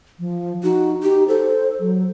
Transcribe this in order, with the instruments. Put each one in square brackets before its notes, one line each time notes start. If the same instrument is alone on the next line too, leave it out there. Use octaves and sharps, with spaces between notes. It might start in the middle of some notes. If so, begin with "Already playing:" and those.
[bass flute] F3
[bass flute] D#4 [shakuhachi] F#4
[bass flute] D#4 [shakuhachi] G4
[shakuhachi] A4 [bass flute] C5
[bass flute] F#3